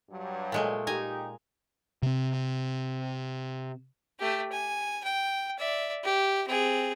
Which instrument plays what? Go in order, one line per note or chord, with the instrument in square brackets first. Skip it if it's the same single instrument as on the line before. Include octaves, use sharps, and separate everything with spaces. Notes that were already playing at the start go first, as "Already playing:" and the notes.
[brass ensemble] G2 F#3
[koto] A#2 G#3 A3
[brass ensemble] D#4 G4 [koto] G#5 A#5
[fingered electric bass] C3 C4
[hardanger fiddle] A3 G4
G#5
G5
D5 E5
G4
C4 G#4